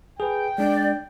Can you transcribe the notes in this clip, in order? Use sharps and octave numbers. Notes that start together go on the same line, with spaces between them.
G#4 B4 G5
G#3 D4 D5